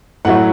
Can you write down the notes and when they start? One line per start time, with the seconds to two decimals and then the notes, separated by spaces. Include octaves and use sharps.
0.25 A2 F#3 A3 F#5